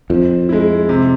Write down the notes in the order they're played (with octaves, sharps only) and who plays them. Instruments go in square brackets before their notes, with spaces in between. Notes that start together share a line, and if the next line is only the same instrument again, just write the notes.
[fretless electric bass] F2 [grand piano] F3
[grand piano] G#3 E4
C3